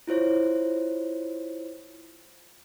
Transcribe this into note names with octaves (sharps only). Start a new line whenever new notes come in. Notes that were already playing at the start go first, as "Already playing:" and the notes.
E4 F4 C5 C#5